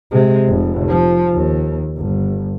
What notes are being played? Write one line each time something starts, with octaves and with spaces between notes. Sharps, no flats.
C3 G#3
F1
F3
D#2
G1